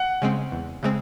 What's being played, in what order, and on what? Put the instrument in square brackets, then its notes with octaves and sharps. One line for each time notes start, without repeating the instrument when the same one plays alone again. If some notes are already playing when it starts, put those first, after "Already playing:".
Already playing: [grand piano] F#5
[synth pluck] C#3 G#3 C4
E2
C#3 G#3 C4